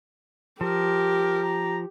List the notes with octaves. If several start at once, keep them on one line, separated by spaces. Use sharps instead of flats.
F3 G4 A#4
A#5